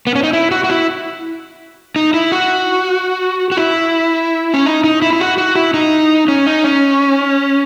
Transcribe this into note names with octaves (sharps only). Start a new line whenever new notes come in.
B3
C#4
D#4
E4
F#4
F#4
E4
D#4
E4
F#4
F#4
E4
C#4
D#4
D#4
E4
E4
F#4
F#4
E4
D#4
C#4
D#4
C#4